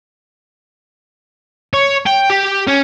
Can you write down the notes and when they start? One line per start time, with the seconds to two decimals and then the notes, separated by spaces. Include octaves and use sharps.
1.74 C#5
2.07 G5
2.30 G4
2.68 C#4